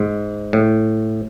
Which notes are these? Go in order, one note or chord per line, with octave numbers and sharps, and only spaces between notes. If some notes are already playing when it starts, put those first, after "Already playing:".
Already playing: G#2
A2